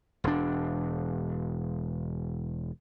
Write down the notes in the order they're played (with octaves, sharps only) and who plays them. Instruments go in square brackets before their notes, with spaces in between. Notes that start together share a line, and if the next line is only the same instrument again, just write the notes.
[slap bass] E1 D4